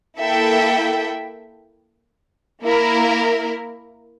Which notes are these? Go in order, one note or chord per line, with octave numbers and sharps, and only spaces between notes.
A#3 E4 A4 E5 G5
A#3 E4 A#4